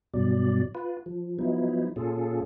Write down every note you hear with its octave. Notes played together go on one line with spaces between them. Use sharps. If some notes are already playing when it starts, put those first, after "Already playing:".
G2 B2 F#3 D5
F4 B4
F3
F3 F#3 B3 D#4 E4
A#2 C#4 F4 G#4 A4